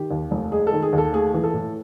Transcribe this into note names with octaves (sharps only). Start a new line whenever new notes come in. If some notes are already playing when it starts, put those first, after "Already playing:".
Already playing: D#3 G4
D#2
F1
G#3 G#4
A4
D#3
G#4
D#2 A4
A3 G#4
E3
A4
A2